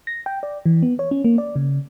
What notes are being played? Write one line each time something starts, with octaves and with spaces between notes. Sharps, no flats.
A#6
G5
D5
E3
B3
C#5
C#4
A#3
D5
C#3